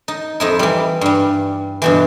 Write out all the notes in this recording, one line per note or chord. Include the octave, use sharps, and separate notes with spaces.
D#4
F2 D#4 E4
E3 G3
G2 G3
G2 B2 E3